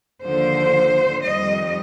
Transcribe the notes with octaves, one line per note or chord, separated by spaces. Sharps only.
D#2 D3 F3 C5
F2 D#3 G3 D#5